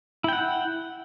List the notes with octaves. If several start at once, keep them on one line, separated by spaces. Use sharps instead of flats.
E4 F#5 G5